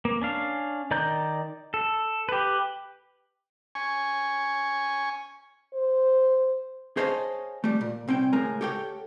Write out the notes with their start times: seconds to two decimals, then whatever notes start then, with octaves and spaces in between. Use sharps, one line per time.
0.05 A#3
0.21 C#4 D4 F5
0.91 D#3 D5 A#5 G6
1.74 A4
2.29 G4 B4
3.75 G#5 C#6
5.74 C5
6.97 G#4 C5 C#5 D#5 F5 A5
7.64 G3 A3
7.81 A#2
8.08 C2 C4 C#4 G5
8.33 C#2 A2 G#3 A#4 G#5 A#5
8.61 G4 A4 C#5 F#5 G5